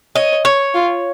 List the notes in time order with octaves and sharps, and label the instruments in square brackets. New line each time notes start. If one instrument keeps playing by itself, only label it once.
[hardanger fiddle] C#5 [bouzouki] D#5
[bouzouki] C#5
[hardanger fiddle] F4